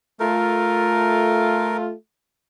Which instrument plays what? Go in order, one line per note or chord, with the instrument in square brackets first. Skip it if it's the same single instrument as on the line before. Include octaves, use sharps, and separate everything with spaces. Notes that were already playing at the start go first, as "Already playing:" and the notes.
[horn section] A3 F4 [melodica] A#4